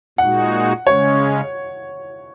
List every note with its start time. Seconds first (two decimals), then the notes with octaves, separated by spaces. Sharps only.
0.18 A#2 G#3 D#4 F#4 F#5
0.86 C#3 G#3 C#4 C#5